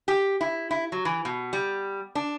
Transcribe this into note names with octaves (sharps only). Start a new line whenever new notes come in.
G4
E4
E4
F#3
E3
B2
G3
D4